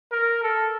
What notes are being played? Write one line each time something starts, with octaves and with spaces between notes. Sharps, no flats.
A#4
A4